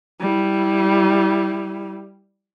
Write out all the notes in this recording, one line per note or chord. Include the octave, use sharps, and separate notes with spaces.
G3 E4